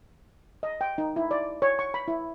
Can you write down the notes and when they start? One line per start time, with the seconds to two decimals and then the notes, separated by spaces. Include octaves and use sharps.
0.63 D#5
0.81 G5
0.98 D#4
1.16 E4
1.31 D5
1.62 C#5
1.79 C#6
1.94 B5
2.08 E4